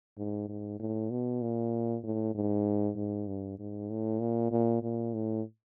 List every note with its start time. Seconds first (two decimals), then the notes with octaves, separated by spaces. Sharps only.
0.17 G#2
0.48 G#2
0.79 A2
1.10 B2
1.41 A#2
2.03 A2
2.34 G#2
2.96 G#2
3.27 G2
3.59 G#2
3.90 A2
4.20 A#2
4.51 A#2
4.82 A#2
5.14 A2